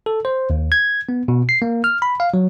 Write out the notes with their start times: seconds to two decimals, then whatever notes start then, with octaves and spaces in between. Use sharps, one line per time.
0.06 A4
0.25 C5
0.50 D#2
0.72 G#6
1.09 B3
1.28 B2
1.49 C7
1.62 A#3
1.84 F6
2.02 B5
2.20 F5
2.34 F#3